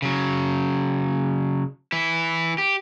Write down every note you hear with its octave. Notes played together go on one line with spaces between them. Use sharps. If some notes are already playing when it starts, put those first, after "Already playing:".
C#3 F#3
E3 E4
G4